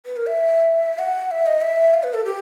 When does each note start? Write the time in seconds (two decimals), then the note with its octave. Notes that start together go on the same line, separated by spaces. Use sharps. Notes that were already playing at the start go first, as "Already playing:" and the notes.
0.06 B4
0.16 A#4
0.26 E5
0.99 F#5
1.31 E5
1.46 D#5
1.62 E5
1.94 F5
2.03 B4
2.14 A4
2.25 G4